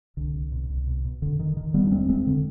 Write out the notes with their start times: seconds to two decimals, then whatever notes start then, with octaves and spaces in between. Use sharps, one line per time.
0.17 C2 D3
0.35 C2
0.52 B2
0.70 C2
0.87 B2
1.04 B2
1.22 F1 D3
1.39 D3 D#3
1.57 D3 D#3
1.74 F1 G3 B3
1.87 D4
1.91 D#2 G#3 C4
2.09 F1 G#3 C4
2.27 D3